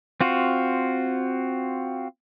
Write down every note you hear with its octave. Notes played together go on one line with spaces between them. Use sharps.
C4 F4 F#4